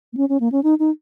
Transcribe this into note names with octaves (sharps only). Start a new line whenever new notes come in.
A#3
C#4
C#4
A#3
C#4
D#4
D#4